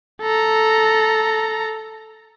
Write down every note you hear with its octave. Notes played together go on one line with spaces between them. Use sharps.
A4 A#5